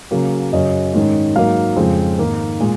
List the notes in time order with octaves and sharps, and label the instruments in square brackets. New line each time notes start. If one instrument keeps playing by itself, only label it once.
[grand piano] C#3 F#3 A#3 C#4
F#2 C#3 F#3 C#4 D#5
G#2 D#3 G#3 C#4
G#2 F#3 A#3 F5
F2 C#3 F3 G#3 C4
G#2 D#3 A#3
A#2 G#3